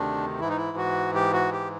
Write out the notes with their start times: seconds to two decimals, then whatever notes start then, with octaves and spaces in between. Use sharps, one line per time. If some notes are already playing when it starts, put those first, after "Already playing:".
Already playing: D2 C3 D#3 D4
0.40 G#2 E3 E4
0.49 D#4
0.56 E4
0.77 F#4
1.15 G4
1.33 F#4
1.52 G4